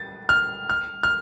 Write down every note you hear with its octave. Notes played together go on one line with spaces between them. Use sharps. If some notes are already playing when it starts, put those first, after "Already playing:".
Already playing: A6
F6
F6
F6